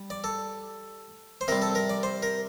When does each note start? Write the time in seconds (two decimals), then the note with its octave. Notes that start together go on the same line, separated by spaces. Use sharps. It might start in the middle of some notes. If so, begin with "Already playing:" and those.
Already playing: G3
0.10 D5
0.24 A4
1.41 C5
1.48 C3 G3 A#4
1.62 A4
1.75 A#4
1.89 D5
2.03 C5
2.22 A#4